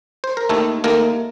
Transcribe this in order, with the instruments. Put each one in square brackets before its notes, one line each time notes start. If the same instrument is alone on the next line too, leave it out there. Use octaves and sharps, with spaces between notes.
[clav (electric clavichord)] C5
A#4
D#2 D#3 A3 A4
D#2 D#3 A3 A#3 A#4